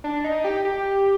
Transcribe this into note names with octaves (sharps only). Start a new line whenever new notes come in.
D4
D#4
G4
G4